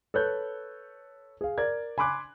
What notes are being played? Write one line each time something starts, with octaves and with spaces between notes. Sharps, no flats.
A4 B4 C#5 F#6 G6
G#4 F5
A#4 D5 G#6
G#5 B5 C6 D6 F#6 G#6